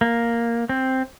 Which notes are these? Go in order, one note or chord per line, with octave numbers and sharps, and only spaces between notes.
A#3
C4